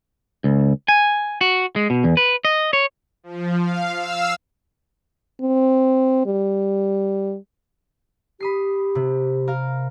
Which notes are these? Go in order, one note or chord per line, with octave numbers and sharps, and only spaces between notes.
C#2
G#5
F#4
G#3
B2
E2
B4
D#5
C#5
F3
F5
F5 E6
C4
G3
G4 B5 D#6 C7
C3
A#4 F5